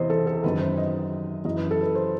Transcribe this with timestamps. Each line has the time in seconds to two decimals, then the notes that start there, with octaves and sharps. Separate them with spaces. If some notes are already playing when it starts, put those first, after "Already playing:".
Already playing: E2 C3 E3 C5 D#5
0.10 A4
0.27 A4
0.44 F#2 D#3 B4
0.61 C5
0.78 D#5
1.45 F#2 E3 D#5
1.57 B4
1.71 A4
1.82 B4
1.95 C5